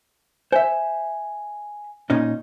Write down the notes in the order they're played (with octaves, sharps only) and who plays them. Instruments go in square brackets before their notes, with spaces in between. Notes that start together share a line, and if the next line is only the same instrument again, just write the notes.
[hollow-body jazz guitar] C5 E5 [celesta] G#5
[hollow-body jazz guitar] A#2 C#4 D#4